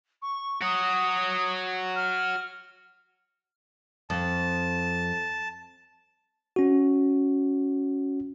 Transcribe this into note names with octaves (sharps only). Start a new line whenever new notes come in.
C#6
F#4 C#5 D#6
F6
F2 A5
C#4 F#4